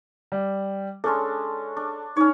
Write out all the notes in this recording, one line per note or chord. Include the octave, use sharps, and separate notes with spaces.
G3
G#3 C#4 D4 A4
D4
C#4 D#4 C#5